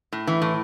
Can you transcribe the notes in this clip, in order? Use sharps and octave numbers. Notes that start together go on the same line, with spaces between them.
A2
E3
A2